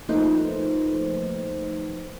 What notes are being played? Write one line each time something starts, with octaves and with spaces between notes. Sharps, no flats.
F3 A3 A#3 D#4 B4 C5